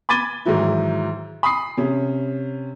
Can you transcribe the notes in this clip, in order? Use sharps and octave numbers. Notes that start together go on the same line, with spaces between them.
B5 D6 G#6 A6 D#7 G7
G#2 D#3 E3 F#3 E4
B5 D#6 C7
C3 C#4